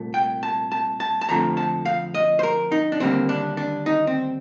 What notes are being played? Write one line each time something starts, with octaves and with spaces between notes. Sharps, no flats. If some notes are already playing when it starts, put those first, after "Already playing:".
Already playing: C2 A#2 A3
G5
A5
A5
A5
A5
F2 D3 F3 A3 C4 A#5
A5
F5
D#5
C5
A#4
D#4
D4
D#2 D3 G3 A#3 C4
D4
D4
D#4
C4